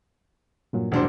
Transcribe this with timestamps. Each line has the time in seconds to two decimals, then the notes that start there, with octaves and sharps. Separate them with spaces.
0.73 G2 A#2 F#3
0.92 E1 D4 C5